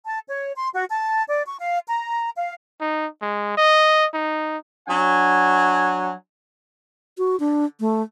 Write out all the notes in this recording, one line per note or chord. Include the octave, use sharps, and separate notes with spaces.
A5
C#5
C6
F#4
A5
D5
C#6
F5
A#5
F5
D#4
G#3
D#5
D#4
F#3 D4 F#5 G#5
F#4
D4
A3